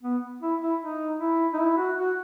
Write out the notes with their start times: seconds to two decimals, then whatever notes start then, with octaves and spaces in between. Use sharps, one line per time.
0.03 B3
0.41 E4
0.62 E4
0.81 D#4
1.20 E4
1.53 D#4
1.59 E4
1.78 F#4
1.98 F#4